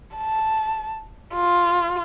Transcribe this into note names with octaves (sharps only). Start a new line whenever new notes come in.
A5
F4